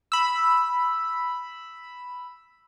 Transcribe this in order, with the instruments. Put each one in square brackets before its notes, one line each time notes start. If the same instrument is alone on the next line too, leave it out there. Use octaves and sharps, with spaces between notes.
[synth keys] B5 E6